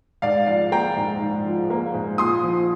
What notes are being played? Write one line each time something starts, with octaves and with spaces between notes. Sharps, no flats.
G#2 D5 F5
F3 D5 F5
A#3 G5 A#5
G#2
G#2
F3
A#3
G#2
A#2 C6 D#6
F3